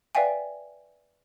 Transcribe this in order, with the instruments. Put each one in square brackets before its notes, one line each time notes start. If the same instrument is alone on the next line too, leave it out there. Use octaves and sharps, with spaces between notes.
[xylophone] B4 D5 E5 F5 G5 G#5